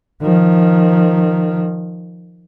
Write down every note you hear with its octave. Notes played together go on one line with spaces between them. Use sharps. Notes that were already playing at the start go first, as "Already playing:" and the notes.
D#3 F3